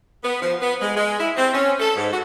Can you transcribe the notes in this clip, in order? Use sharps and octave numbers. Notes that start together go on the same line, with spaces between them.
B3
F3
B3
G#3
G#3
E4
C4
C#4
A4
G#2
F#4